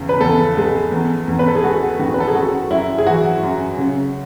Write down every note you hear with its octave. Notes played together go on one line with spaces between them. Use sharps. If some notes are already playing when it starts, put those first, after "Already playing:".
Already playing: E2 C#3
B4
E2 A4
G#3
E2
E2
B4
A4
G#4
G#3 F#4
D#3 F#4
B4
A4
G#4
F#2 F#4
F#2 E4
G#4
E3 F#4
F#2
C#3